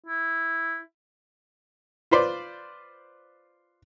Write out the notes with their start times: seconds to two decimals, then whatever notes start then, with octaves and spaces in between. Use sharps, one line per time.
0.06 E4
2.11 F4 B4 C5 D5